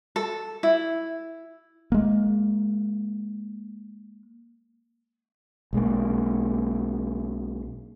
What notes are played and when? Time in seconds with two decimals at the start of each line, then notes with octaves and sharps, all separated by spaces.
0.16 A4
0.63 E4
1.92 G#3 A#3
5.73 B1 G#3 A#3